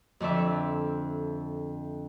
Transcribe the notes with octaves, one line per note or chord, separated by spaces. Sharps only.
F2 D3 D5 E5